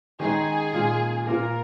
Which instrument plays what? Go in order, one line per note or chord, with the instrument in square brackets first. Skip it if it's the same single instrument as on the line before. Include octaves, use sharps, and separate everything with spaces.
[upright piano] D#3 G#3 D#4 [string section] G#4
[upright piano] A#2 G#3 F4
[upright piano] A#2 A#3 F4 [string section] A#4